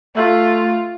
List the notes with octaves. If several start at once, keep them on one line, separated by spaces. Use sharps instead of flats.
A3 F4